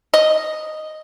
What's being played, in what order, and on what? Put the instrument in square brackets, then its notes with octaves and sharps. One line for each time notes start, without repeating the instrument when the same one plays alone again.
[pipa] D#5